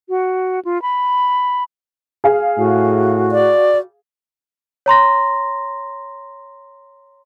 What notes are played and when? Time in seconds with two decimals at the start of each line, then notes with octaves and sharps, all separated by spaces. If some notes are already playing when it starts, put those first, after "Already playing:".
0.09 F#4
0.65 F4
0.82 B5
2.24 G#4 F5
2.58 A2 F#4
3.32 D5
4.86 C#5 A#5 C6 A#6